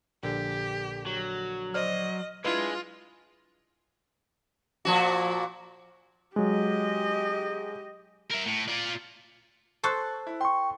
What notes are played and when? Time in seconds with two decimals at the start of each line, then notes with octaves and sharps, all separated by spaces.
0.23 A#1 D3 G4
1.06 F#3
1.74 C5 D5 D#5 F6
2.44 G#3 D4 E4 F4 B4
4.85 A#2 F3 F#4
6.36 F#3 G#3 G4 D#5
8.31 A#4 E5
8.46 A2
8.69 F4 D5
9.83 A4 C5 C6 C#6 F#6
10.27 E4
10.41 G5 C6 C#6